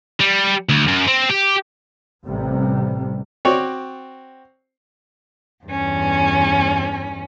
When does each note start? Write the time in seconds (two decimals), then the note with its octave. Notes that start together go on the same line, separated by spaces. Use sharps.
0.20 G3
0.69 D2
0.88 F#2
1.07 C4
1.30 G4
2.26 A1 C3 G3
3.45 C4 F#4 C#5 D5
5.65 E2 G2 C#4